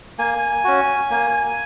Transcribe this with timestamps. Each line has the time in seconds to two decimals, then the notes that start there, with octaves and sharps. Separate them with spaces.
0.18 A#3 G#5
0.64 C#4 F#4
1.10 A#3